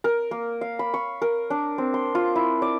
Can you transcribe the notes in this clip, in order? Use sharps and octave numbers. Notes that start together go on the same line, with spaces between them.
A#4
A#3
F5
B5
C#6
A#4
D4
C4
C6
F4
E4
D5